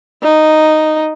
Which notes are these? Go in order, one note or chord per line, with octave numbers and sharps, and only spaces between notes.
D#4